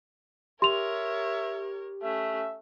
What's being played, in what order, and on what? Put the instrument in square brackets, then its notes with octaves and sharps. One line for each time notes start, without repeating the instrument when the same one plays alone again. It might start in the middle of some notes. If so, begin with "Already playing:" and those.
[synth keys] G4 [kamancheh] A#4 C#5 [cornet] E5 [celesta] C6 F7
[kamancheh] A3 C#4 [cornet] E5